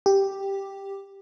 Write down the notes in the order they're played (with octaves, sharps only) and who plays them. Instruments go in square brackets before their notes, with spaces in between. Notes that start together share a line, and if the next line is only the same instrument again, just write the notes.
[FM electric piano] G4